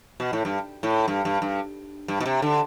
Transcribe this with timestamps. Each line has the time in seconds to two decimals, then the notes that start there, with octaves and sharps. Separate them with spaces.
0.20 B2
0.33 A2
0.45 G2
0.83 A2
1.08 G2
1.25 G2
1.42 G2
2.08 G2
2.20 B2
2.26 C3
2.42 D3